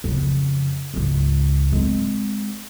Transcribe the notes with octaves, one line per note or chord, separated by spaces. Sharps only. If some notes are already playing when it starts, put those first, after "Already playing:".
F2 C#3
C#2 G#2
G#3 C4